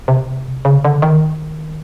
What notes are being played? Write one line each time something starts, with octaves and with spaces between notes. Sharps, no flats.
C3
C#3
D3
D#3